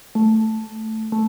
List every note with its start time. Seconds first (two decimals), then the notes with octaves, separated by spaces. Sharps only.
0.15 A3
1.12 A3